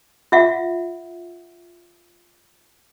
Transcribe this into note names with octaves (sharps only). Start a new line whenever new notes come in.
F4 E5 F#5